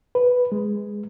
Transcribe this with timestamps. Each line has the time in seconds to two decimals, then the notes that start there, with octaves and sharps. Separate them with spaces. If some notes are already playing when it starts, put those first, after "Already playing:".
0.15 B4
0.52 G#3